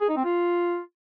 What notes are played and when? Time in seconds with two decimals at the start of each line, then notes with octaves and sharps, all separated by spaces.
0.01 G#4
0.09 D#4
0.17 C4
0.25 F4